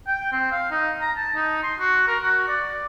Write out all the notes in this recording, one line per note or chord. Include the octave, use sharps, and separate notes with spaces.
G5
C4
F5
D#4
A#5
A5
D#4
C6
F#4
A#4
F#4
D5